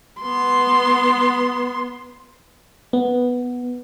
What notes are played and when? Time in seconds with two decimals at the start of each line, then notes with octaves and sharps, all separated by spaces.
0.22 B3 C6
2.93 B3